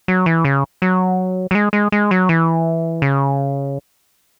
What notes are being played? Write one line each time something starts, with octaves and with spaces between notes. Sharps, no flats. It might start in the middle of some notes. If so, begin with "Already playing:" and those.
F#3
E3
C#3
F#3
F#3
G#3
G#3
G#3
F#3
E3
C#3